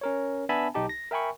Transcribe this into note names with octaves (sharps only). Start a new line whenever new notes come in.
C#4 A#4 C#5
B3 D4 E5 G#5 A5 B5
B1 D#4 G4 A5
A#6
A#4 E5 G5 G#5 B5 C#6